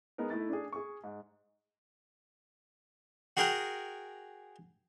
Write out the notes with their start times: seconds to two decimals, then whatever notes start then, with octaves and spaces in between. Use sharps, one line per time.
0.18 G#3 B3 D#4 A#4
0.30 A3 D#4 E4 A6
0.50 D4 G#4
0.73 G#4 C#6
1.04 G#2
3.37 F#4 G#4 A#4 F#5 G5 A#5